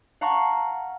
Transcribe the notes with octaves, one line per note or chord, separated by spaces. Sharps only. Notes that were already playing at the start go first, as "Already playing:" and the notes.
F5 F#5 A5 A#5 C#6 F#6